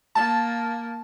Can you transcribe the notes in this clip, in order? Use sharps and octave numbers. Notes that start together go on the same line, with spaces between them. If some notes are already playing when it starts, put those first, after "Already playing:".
A#3 A5